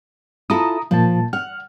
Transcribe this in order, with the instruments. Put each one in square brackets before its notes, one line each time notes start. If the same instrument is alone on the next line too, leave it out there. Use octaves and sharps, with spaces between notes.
[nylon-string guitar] E4 F4 A4 [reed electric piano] A#5 D#6
[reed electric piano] A#2 A5 [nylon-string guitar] F3
[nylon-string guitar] F#5 [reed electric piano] F6